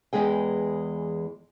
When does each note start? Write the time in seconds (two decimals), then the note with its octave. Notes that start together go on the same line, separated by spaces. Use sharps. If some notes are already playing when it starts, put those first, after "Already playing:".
0.13 E2 A2 E3 G#3 G#4 G5